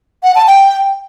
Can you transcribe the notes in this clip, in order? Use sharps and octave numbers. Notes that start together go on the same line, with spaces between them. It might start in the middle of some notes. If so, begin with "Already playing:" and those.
F#5
A5
G5